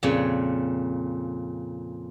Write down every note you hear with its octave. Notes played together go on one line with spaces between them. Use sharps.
F2 A#2 C#3 C#5